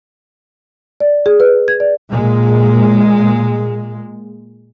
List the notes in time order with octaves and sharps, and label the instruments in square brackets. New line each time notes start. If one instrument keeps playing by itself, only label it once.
[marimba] D5
G#4
B4
G#6
D5
[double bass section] A#2 G#3